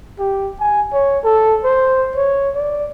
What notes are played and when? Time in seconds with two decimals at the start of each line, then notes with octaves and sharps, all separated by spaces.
0.19 G4
0.60 G#5
0.93 C#5
1.24 A4
1.64 C5
2.16 C#5
2.55 D5